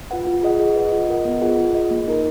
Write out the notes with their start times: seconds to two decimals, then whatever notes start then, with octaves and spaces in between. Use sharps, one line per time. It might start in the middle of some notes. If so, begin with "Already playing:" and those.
0.11 F4 B4 F#5
0.27 F4
0.43 G#4 D#5 F#5
0.60 G#4
0.76 B4 D#5 F#5
0.92 F4
1.09 A#4 D#5 F#5
1.25 B3
1.42 F4 G#4 B4 F#5
1.58 F4
1.75 G#4 D#5
1.91 A#3
2.07 D#4 A#4